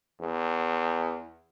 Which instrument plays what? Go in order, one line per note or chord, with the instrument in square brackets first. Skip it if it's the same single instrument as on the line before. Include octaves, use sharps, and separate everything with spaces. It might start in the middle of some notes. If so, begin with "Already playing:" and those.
[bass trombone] E2